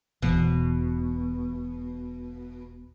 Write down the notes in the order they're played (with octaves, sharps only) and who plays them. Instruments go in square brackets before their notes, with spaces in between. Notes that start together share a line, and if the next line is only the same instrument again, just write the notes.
[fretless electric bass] E1 E2 [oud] B2